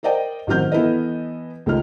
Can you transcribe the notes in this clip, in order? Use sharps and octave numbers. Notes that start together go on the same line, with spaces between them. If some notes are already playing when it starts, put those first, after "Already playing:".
A#4 C5 D5 D#5 G5
A1 D#3 F#3 C4 F6 G6
E3 B3 E4 A4 B4 D#5
C#2 A3 D#4 F6